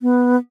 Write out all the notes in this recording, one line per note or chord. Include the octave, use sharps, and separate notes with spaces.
B3